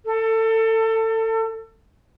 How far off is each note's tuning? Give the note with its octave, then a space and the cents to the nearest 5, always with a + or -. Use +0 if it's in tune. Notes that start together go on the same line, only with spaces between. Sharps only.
A4 +25